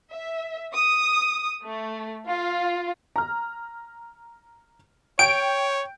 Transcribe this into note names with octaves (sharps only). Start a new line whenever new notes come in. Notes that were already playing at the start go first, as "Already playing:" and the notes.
E5
D#6
A3
F4
A#5 F6
C#5 G5 G6 D7